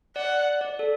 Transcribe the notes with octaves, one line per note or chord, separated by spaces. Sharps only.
D5 F#5
D5
A4